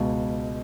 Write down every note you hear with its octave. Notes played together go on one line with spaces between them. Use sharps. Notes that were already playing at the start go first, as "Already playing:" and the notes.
Already playing: C#2 B2